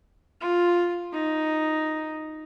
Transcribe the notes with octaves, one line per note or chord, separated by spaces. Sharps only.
F4
D#4